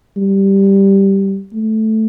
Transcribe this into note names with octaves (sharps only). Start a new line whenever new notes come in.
G3
A3